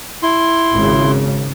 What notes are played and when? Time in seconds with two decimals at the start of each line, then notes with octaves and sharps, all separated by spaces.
0.23 E4 C6
0.74 G#1 C#3